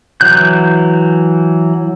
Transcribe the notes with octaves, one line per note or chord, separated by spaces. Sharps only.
E3 F#3 F#6 G6